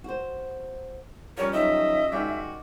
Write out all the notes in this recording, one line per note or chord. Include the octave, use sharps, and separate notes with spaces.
F#4 C5
F3 G3 C#4 A#4 C#5
D#3 F#3 D#5 E5
D#3 G#3 F#4 D5 G5